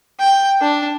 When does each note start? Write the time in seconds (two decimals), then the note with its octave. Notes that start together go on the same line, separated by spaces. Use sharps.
0.20 G5
0.61 D4